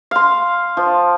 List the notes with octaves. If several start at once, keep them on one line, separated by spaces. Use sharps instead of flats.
F5 C6
F3